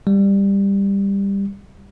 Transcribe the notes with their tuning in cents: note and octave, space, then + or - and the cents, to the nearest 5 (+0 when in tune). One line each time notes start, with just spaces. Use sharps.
G3 +15